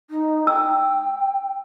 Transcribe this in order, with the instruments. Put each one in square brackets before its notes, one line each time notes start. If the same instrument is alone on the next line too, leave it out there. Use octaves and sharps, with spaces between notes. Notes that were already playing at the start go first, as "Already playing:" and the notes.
[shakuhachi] D#4
[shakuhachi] G5 [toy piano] E6